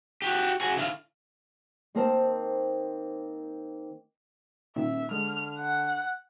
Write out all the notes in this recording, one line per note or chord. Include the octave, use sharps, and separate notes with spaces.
F#4 G4
F#4 G#4
D3 E4 F5
D#3 A#3 C4 A#4 C5 A5
D#1 A#2 D#3 E5
D3 G#3 F6
F#5